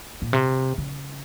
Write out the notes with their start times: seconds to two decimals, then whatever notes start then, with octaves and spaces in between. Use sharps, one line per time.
0.22 A#2
0.33 C3
0.78 C#3